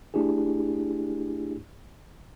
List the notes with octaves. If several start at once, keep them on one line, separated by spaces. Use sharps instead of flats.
A3 D4 E4 G4 G#4